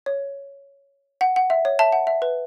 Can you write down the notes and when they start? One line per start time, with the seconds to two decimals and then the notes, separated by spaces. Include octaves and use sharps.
0.06 C#5
1.21 F#5
1.36 F#5
1.50 E5
1.65 C#5
1.79 E5 A5
1.92 F#5
2.07 E5
2.22 B4